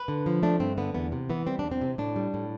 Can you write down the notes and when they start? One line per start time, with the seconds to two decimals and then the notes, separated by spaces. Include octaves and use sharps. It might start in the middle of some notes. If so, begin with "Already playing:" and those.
Already playing: B4
0.08 D3
0.26 F3
0.43 A3 D4
0.60 G2 C4
0.78 D3 B3
0.94 E2 B3
1.12 C3
1.30 E3 B3
1.46 G3 C4
1.59 E2 D4
1.71 C4
1.81 C3
1.98 A2 D4
2.16 G3
2.34 A2